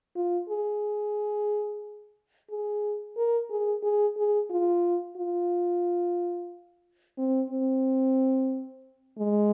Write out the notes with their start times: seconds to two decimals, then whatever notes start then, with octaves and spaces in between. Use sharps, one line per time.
0.16 F4
0.50 G#4
2.50 G#4
3.17 A#4
3.50 G#4
3.83 G#4
4.17 G#4
4.50 F4
5.17 F4
7.18 C4
7.51 C4
9.18 G#3